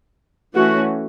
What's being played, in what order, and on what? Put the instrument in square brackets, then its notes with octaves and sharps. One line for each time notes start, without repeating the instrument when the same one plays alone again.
[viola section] E3 A3 C#4 F#4